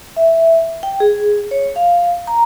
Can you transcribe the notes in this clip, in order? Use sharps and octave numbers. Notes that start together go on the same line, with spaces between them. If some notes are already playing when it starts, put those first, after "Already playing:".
E5
G5
G#4
C#5
F5
A#5